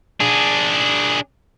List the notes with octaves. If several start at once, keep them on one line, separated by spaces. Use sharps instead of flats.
D4 G#4